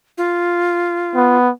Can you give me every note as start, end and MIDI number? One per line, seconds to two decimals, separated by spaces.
0.18 1.37 65
1.15 1.51 59